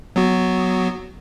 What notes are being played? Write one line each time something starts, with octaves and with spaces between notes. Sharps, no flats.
F#3 B3 F#4